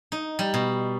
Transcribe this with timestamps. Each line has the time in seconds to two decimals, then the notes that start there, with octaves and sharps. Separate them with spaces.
0.12 D#4
0.39 G3
0.54 B2